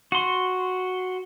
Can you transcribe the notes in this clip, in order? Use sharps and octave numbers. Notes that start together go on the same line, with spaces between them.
F#4 C6